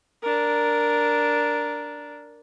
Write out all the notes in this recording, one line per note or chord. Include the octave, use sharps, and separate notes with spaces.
D4 A#4